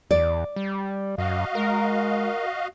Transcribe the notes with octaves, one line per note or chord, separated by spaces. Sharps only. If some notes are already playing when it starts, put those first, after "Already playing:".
E2 D5
G3
F#2 F#4 D#5 F5
G#3 A#4